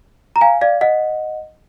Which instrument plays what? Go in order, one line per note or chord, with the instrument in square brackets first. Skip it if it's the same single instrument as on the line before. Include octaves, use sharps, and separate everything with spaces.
[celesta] A#5
F5 G#5
D5 F5
D#5 F#5